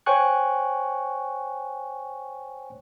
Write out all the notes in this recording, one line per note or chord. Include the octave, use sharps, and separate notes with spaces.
C5 C#5 G5 G#5 C#6 F#6